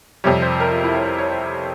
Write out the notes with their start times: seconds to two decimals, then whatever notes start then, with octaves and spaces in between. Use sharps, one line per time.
0.24 F2 C3 G3 C#5
0.42 C5
0.60 A#4
0.71 F4
0.84 E4
0.95 C#5
1.06 C5
1.18 C#5
1.31 C5